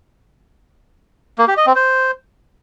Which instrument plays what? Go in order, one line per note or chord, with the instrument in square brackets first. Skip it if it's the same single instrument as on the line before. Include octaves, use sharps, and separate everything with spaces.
[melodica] A#3
G4
D#5
C4
C5